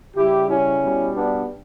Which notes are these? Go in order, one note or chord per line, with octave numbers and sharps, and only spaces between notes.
C#3 G3 E4 G4
C#4 E4
B2 G3
B3 D4